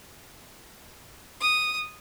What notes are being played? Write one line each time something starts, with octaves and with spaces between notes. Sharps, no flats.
D#6